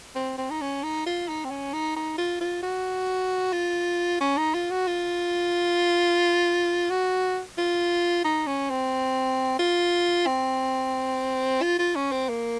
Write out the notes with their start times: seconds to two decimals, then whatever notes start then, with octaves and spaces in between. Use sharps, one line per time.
0.16 C4
0.38 C4
0.50 D#4
0.61 C#4
0.83 D#4
1.06 F4
1.28 D#4
1.45 C4
1.50 C#4
1.73 D#4
1.96 D#4
2.18 F4
2.41 F4
2.63 F#4
3.53 F4
4.21 C#4
4.37 D#4
4.54 F4
4.71 F#4
4.87 F4
6.90 F#4
7.58 F4
8.24 D#4
8.47 C#4
8.70 C4
9.59 F4
10.26 C4
11.62 F4
11.79 F4
11.95 C#4
12.12 C4
12.29 A#3